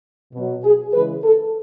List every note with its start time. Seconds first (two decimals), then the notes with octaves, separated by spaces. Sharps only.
0.33 B2 F#3
0.64 G#4
0.93 C#3 E3 G#3 B4
1.24 A4